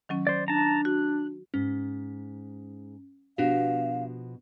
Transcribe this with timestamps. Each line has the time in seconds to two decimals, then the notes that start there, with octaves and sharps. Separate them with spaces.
0.09 D#3 F#3 C#4
0.27 C5 D5
0.48 D4 A5 A#5
0.85 F#4 F#6
1.54 G#2 C#4
3.38 B2 F3 D4 F#4 G4 F5